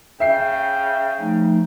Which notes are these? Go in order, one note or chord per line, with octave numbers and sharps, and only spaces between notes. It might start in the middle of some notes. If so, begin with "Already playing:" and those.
C#3 E5 G5 C7
F3 A3 D#4